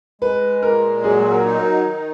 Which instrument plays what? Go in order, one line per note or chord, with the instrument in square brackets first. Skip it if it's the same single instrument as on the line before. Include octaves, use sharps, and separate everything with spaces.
[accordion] G#3 [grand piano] B4
[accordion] A#2 [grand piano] A#4
[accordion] F#3 [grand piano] G#4
[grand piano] A#4
[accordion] D#4
[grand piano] A#4
[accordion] D#3